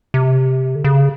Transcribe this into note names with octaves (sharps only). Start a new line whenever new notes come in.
C3
D3
C#3